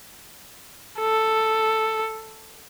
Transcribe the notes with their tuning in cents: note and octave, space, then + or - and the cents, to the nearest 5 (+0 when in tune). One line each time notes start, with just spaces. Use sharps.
A4 +5